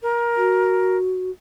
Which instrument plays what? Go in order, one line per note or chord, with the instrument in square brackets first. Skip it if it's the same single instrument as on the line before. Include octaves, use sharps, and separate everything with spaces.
[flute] A#4
[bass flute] F#4